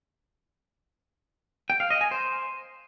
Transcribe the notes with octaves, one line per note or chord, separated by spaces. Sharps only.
G5
F5
D#5
G#5
C5